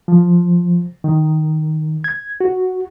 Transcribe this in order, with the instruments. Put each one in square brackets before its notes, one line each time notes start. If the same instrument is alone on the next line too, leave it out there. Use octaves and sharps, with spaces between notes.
[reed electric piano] F3
D#3
G#6
F#4